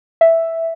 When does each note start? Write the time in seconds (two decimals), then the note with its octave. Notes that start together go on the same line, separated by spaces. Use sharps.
0.21 E5